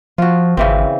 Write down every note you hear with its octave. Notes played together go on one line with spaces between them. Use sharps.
F3 F4 F#4
G#1 C#3 E3 C4